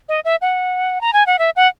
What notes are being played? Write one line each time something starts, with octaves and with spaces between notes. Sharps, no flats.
D#5
E5
F#5
A#5
G#5
F#5
E5
F#5